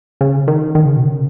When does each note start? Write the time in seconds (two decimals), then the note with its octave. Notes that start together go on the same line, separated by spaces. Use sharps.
0.21 C#3
0.48 D#3
0.75 D#3
0.86 C#3
0.96 B2
1.07 C#3